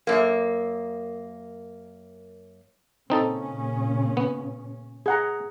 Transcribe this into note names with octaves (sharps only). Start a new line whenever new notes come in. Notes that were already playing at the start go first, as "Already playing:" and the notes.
F#2 A#3
A#2 C#3 C4 C#4 D#4 A4
B3
G#4 F#5 A#5